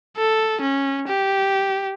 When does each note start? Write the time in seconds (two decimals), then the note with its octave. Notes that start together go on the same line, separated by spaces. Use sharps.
0.17 A4
0.61 C#4
1.07 G4